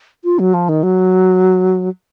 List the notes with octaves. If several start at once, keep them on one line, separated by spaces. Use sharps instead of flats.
F4
F#3
F3
D#3
F#3